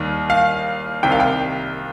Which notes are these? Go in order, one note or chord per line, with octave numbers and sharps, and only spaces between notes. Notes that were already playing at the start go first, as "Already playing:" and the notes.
Already playing: D#2 D#3 G3
F5
C2 C3 D#3 G5
F5
G5